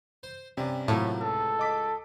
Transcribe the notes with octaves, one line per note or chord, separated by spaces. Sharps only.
C5
G2 C3 G3 C#4
A2 F3 F#3 A3 A#3
C#2 A4
D#5 D6 B6